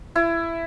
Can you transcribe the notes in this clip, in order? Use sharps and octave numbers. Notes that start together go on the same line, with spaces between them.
E4